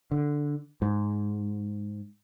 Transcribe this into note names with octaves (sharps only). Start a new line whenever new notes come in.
D3
G#2